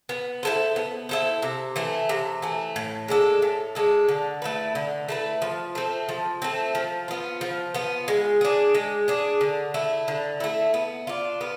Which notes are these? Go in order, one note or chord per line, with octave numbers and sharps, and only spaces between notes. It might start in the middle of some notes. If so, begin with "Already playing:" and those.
B3
E4 A4 C5
B3
E4 A4 C5
C3
E3 A3
C3
E3 A3
A2
G#3 D4 A4
A2
G#3 D4 A4
D3
A3 E4 B4
D3
A3 E4 B4
F3
A3 C4
F3
A3 C4
F3
B3 F4
F3
B3 F4
G#3
D4 G#4
G#3
D4 G#4
D3
A3 E4
D3
A3 E4
B3
D4 F4
B3